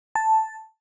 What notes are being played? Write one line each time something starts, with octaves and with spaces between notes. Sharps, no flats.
A5